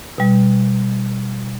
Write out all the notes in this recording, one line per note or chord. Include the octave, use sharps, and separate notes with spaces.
B2 G3